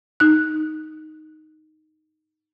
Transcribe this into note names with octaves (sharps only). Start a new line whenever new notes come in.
D#4 F#6